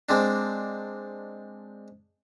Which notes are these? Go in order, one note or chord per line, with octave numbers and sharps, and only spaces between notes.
G#3 C4 D4